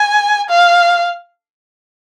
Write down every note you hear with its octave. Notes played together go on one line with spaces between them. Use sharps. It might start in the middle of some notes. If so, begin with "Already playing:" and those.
Already playing: G#5
F5